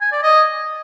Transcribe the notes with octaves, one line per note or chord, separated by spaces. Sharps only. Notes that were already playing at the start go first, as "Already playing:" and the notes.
G#5
D5
D#5